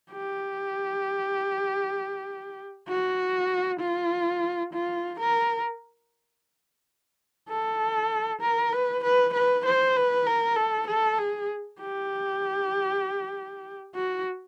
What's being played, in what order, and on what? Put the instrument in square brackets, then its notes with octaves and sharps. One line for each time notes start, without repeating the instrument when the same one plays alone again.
[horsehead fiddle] G4
F#4
F4
F4
A#4
A4
A#4
B4
B4
B4
C5
B4
A#4
A4
A4
G#4
G4
F#4